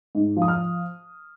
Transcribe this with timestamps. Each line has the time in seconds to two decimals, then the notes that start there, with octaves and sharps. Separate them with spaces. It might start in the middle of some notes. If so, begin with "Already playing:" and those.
0.15 G#2
0.37 F3
0.42 D#6
0.48 F6